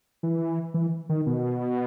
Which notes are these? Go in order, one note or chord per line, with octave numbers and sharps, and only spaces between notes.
E3
E3
D#3
B2